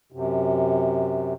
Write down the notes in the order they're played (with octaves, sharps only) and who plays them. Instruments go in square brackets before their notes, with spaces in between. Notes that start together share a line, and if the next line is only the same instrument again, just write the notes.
[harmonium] F#2 C3